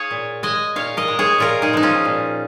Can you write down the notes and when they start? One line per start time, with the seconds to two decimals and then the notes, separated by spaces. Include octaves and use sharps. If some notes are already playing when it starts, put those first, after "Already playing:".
Already playing: G#4 C#5 F5
0.11 A#2
0.43 G#3 D#5 G#5
0.76 A#2 C#5 F5
0.97 A#4 D#5
1.08 G#3
1.19 G#4 C#5
1.38 A#2 F4 A#4
1.62 D#4 G#4
1.73 F3 G#3 D#4
1.83 C#4 F4
2.05 A#2